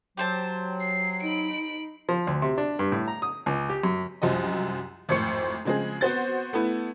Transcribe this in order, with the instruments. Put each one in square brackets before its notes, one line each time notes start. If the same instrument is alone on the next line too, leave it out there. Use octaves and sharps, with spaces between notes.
[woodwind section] F#3 [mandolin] G4 C5 A5
[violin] C7
[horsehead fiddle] D#4 [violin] B5 D7
[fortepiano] F3
D2
C3
D4
G2
A2
A#5
D#6
C#2
G4
F#2
[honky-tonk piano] C2 F#2 F3 F#3 D#5
G#1 F2 A2 C5 C#6 C#7
C#3 F3 G#3 C4 G#4
B3 C4 F#4 C5 G6 A6
A3 B3 E4